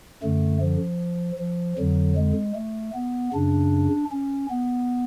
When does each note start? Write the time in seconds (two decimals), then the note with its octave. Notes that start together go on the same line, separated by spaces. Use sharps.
0.23 F#2 D3 A3
0.61 F3
1.39 F3
1.78 F2 D3 F#3
2.17 G#3
2.56 A3
2.95 B3
3.33 F#2 C#3 D4
4.11 C#4
4.51 B3